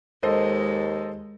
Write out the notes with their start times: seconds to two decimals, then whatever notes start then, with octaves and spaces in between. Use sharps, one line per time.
0.23 D#2 G#3 A4 C5 D#5